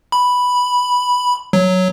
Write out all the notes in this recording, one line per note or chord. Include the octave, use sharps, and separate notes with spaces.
B5
F#3